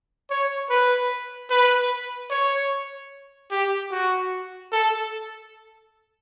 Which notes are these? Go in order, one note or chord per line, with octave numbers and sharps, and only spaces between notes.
C#5
B4
B4
C#5
G4
F#4
A4